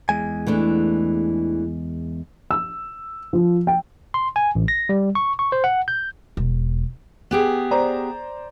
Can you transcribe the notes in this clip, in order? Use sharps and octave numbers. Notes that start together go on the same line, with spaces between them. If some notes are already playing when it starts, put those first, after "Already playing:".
E2 G#3 G#5
E3 A3 D4
E6
F3
G5
C6
G#5
A1
A#6
G3
C#6
C#6
C5
F#5
G6
E1
B3 G4 G#4
C5 D5 A#5